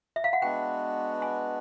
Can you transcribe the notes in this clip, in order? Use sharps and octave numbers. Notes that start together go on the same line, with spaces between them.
E5
F5
F#5
G#3 B3 D4 F#4 B4 G5
G#5